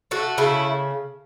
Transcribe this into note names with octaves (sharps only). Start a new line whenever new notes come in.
A3 F#4
C#3 E4